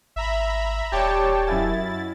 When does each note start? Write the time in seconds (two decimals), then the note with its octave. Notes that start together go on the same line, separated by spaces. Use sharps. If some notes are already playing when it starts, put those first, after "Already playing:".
0.16 G#1 E5 A#5 B5
0.92 D#1 G3 G4 C#5 G5 A5
1.47 F#2 E4 D#5 F5 G#5 A6